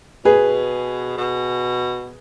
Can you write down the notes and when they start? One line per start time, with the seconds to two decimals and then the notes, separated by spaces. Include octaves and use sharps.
0.25 B2 G#4 B4
1.17 B2